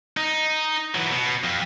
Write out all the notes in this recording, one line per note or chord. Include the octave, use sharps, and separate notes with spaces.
D#4
E3 F#3
B2
F2